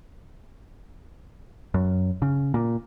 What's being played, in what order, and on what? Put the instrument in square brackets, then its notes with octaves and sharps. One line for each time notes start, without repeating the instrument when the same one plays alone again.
[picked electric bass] F#2
C#3
A#2